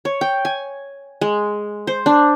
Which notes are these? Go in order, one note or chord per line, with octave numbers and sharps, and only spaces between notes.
C#5
G5
G#5
G#3
C5
D4